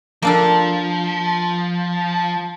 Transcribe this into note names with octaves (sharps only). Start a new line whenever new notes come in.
F3 A#3 D4 A4